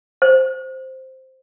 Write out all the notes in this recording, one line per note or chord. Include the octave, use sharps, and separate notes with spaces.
C5